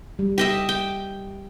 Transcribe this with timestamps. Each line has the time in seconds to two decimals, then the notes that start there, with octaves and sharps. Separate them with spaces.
0.19 G3
0.38 G4 D#5 E5
0.69 G5